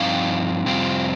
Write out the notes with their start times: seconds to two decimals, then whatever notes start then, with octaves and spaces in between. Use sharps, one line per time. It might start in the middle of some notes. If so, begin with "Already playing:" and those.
Already playing: G2 F3 C4 D#4 F5
0.66 F2 C3 G3 C4 F4